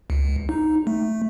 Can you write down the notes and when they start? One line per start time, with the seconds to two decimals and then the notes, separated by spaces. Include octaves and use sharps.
0.10 C#2
0.49 D#4
0.87 A3